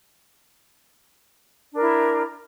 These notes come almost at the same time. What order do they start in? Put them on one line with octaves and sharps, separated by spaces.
D4 A#4 E4